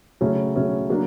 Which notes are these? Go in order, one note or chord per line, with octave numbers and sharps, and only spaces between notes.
C#3 F#3 A3 C#4
C#3 F#3 A3 C#4
F#3 A#3 D4